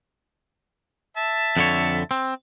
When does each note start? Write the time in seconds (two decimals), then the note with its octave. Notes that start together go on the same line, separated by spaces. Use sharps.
1.17 E5 A5
1.57 F2 D3 C#5
2.11 C4